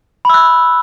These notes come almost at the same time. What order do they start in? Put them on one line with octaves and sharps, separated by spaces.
B5 E6 F#6